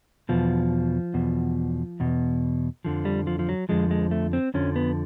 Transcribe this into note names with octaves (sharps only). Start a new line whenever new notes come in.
E2 B2 F3
E2 B2
E2 B2
F2 D3 F3
G3
F3
F3
F#3
F2 D3 F3 G#3
G#3
A3
C4
F2 D3 F3 C#4
B3